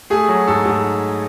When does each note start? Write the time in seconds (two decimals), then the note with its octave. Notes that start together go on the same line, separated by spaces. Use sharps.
0.10 A3 G#4
0.29 F#3
0.48 G#2 A4
0.65 G#2